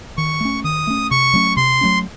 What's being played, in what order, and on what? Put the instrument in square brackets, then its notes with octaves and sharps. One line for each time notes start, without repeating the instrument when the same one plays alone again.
[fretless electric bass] D#3 [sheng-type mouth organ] C#6
[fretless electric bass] A3 C#4
[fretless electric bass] D#3 [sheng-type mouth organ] D#6
[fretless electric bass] A3 C#4
[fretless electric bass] C3 [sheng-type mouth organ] C#6
[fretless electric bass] F#3 A3 C#4
[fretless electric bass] C3 [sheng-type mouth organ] C6
[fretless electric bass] F#3 A3 C#4